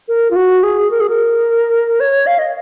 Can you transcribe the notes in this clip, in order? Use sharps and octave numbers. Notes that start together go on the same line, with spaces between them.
A#4
F4
F#4
G#4
A#4
G#4
A#4
C#5
F5
D#5